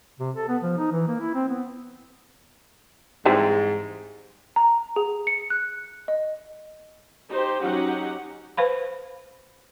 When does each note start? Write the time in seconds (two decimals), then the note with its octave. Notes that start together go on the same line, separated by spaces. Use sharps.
0.20 C3
0.36 A4
0.48 B3
0.63 F3
0.78 D#4
0.92 E3
1.08 A#3
1.20 E4
1.35 C4
1.49 B3
3.25 G#2 E3 G3 C4
4.56 A#5
4.96 G#4
5.27 C#7
5.50 F#6
6.08 D#5
7.29 D#4 G4 C5
7.61 F#3 C#4 D#4 G4 F#5
8.57 B4 C5 F5 B5